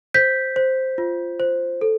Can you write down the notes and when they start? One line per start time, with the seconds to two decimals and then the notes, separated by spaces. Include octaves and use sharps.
0.14 C5 G6 B6
0.56 C5
0.98 F4
1.40 C5
1.81 A4